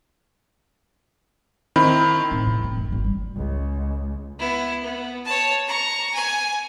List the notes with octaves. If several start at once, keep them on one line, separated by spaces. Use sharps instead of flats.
D#3 C4 E4 B5
A2
C#3
C4
F#1
G#1
G3
C#2
B3 E4
B3
C#5 A5
A#5 C#6
G#5